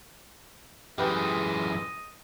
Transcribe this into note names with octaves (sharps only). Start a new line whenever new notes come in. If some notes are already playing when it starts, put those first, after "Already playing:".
F#2 E3 G#3 G4 B4 D#5 G5